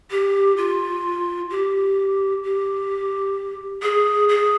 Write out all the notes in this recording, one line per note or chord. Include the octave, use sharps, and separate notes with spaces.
G4
F4
G4
G4
G#4
G#4